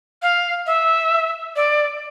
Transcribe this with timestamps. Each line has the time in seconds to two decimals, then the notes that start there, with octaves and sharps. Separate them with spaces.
0.22 F5
0.67 E5
1.56 D5